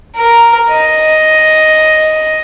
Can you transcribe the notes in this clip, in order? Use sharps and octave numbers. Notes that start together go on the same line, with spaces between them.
A#4
D#5